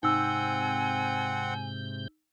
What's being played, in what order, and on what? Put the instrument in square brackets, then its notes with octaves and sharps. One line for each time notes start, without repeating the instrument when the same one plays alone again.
[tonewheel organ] G#2 C3 G6 [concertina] C4 F#5 [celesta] D#4 E6 [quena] G#5